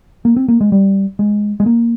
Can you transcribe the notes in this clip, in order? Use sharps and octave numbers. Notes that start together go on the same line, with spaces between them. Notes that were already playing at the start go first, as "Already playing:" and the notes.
A#3
C4
A#3
G#3
G3
G#3
G#3
A#3